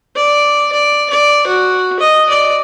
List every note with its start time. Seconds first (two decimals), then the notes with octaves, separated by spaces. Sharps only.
0.16 D5
0.72 D5
1.10 D5
1.47 F#4
2.00 D#5
2.29 D5